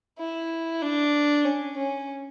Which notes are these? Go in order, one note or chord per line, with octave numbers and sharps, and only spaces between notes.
E4
D4
C#4
C#4